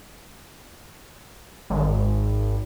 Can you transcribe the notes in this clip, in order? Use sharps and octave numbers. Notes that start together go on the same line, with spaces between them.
G#1